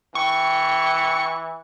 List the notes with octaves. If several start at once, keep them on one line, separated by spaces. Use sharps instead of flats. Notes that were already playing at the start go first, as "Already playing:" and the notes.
E3 G5 C#6